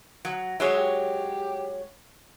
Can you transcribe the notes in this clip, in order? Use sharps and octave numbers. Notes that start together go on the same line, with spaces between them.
F#3
F#3 G#3 C#5 E5
G4